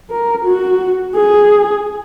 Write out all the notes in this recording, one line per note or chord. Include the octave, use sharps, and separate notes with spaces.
A#4
F#4
G#4